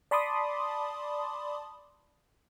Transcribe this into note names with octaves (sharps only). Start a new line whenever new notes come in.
D5 A5 B5 C6 D6 D#6